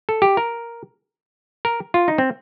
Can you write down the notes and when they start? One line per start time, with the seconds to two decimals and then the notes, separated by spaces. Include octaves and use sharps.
0.09 A4
0.22 G4
0.37 A#4
1.65 A#4
1.94 F4
2.08 D#4
2.18 C4